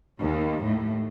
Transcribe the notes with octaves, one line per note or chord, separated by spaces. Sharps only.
D#2
A2